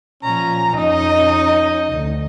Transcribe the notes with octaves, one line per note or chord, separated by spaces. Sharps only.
A#2 F3 C#4 A#5
F2 C#4 D#4 D#5
D2